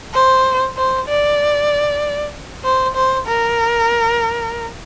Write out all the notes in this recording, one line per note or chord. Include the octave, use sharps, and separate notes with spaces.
C5
C5
D5
C5
C5
A#4